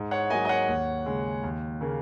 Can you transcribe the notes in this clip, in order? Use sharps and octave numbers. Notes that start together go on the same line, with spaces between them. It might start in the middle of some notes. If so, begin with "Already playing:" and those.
Already playing: G#2
C#5 F#5
F#3 A#3 D#5 G#5
D#5
C#5 F#5
D#2
C#3 G#3
D#2
C#3 A#3